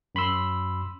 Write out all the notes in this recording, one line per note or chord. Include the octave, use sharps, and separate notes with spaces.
F#2 B5 C6 E6